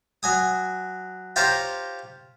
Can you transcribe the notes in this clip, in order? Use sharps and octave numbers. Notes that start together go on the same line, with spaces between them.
F#3 G#5 D#6
F4 G4 C5 C#5 F5 A#5